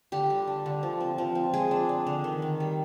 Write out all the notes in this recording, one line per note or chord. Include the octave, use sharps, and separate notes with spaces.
D3 G4
G3
D4
D3
F3
C4
F3
C4
G#3 G#4
D4
D4
D3
D#3
D#3
G3